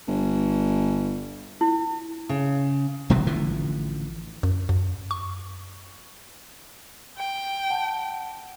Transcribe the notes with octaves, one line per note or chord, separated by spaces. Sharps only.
G1
E4
C#3
B2 D3 F#3 A3
A1 D3 E3 F3
F#2
F#2
C#6
G5
F#5 A5